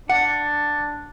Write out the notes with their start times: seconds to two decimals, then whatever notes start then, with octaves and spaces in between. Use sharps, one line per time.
0.10 D4 F#5